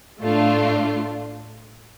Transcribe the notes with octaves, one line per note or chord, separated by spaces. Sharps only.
A2 A3 D4 F4